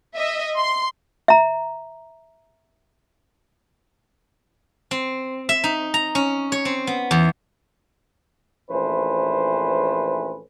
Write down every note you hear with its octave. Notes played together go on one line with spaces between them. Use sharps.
D#5 E5
C6
E5 A#5
C4
E5
D#4
A#5
C#4
C#5
C4
B3
E2
A#1 E3 A3 C#4 B4 C5